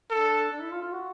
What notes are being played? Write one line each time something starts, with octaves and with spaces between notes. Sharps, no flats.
D4 A4
D4
E4
F4
F4
F#4